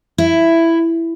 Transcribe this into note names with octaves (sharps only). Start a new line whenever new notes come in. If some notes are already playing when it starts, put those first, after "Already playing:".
E4